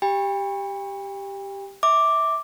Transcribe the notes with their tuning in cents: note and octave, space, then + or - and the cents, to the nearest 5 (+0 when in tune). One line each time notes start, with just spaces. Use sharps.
G4 +0 G5 +40 B5 -5
E5 -20 D6 +0